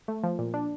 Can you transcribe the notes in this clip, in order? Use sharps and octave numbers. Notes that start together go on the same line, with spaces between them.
A3
F3
A#2
D4